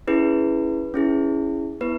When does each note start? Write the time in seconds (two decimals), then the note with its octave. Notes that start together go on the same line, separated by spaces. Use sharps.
0.07 C#4 E4 G#4 B4
0.94 C#4 E4 G#4
1.81 B3 E4 B4